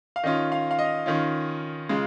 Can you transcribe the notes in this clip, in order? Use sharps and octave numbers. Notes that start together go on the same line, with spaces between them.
F5
D#3 C#4 F4 D#5
F5
F5
D#5
D#3 C#4 F4
C#3 G#3 F4